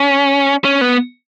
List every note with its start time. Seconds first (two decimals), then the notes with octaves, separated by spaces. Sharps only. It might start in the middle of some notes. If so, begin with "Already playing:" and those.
Already playing: C#4
0.65 C#4
0.81 B3